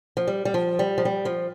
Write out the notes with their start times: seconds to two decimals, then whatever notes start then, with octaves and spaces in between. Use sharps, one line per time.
0.17 F3
0.27 G3
0.45 G3
0.54 F3
0.79 G3
0.98 F3
1.05 G3
1.25 F3